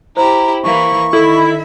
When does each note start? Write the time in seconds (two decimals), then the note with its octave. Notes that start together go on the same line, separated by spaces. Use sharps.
0.17 E4 G4 C5 A#5
0.64 E3 A#3 E4 C#6
1.13 D#3 E4 A4 E5